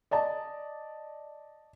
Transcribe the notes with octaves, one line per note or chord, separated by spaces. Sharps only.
D5 D#5 A5